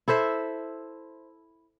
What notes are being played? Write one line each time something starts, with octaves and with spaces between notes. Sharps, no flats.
E4 A4 C5 E5